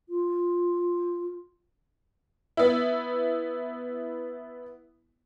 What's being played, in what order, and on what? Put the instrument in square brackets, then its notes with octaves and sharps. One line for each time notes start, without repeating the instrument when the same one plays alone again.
[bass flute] F4
[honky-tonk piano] B3 E4